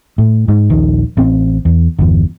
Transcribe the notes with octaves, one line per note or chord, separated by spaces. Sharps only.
A2
G#2
D#1 A#1 D#3
A1 C4
E2
G1 E2